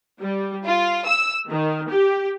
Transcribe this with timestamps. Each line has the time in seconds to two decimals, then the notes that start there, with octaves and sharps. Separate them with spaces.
0.19 G3
0.66 F4
1.06 E6
1.50 D#3
1.90 G4